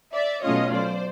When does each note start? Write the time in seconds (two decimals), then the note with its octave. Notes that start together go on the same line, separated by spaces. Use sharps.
0.14 D5 E5
0.43 B2 F#3 A3 C#4 F4 C#5 D#5
0.73 C5 D5